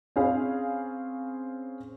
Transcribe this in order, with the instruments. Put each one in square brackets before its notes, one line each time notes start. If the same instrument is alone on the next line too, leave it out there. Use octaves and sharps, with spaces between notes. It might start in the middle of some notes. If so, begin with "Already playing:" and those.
[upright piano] C4 C#4 G#4 F5 B5